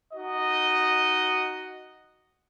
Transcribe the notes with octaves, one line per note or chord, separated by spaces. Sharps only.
D#4 F#4 D#5